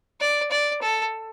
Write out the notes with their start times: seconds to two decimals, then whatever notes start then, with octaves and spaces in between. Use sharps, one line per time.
0.21 D5
0.51 D5
0.82 A4